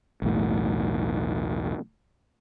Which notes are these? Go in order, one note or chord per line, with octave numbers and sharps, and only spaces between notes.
B1 E2 A2